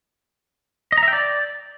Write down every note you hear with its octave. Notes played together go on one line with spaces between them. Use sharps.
D#5
A#5
E5
G5
D5